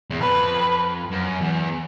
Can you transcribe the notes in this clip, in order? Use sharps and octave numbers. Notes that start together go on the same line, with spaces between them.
E2
F2 B4
F#2
E2